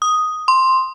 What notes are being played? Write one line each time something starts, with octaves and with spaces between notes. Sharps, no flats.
D#6
C6